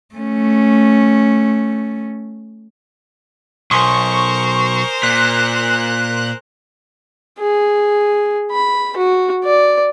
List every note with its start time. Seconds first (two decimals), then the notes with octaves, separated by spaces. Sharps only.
0.15 A3 C#4
3.71 B1 A#4 C5 G#5 C6 C#6 D#6
5.03 A#2 F#6
7.39 G#4
8.51 B5
8.97 F#4
9.44 D5